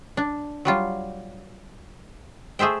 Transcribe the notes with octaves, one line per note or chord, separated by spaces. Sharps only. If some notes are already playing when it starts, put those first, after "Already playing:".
D4
F#3 G3 F4
A3 G#4 C5 E5 G5